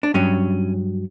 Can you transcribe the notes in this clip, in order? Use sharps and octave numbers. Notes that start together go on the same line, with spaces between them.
D4
G2 F#3 C#4